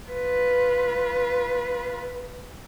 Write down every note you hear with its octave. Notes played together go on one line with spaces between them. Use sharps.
F4 B4